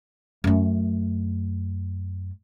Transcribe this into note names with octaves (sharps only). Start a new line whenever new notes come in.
F#2 A3